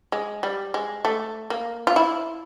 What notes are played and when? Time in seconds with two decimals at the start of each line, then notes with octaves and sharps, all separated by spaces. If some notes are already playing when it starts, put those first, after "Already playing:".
0.12 G#3
0.43 G3
0.74 G#3
1.05 A3
1.50 A#3
1.87 F4
1.96 E4